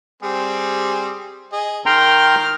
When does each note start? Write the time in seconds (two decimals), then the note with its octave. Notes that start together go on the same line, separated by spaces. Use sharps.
0.23 G3 C4 G#4
1.53 G#4 D#5
1.86 D#3 A#4 G5 A#5 C6 F6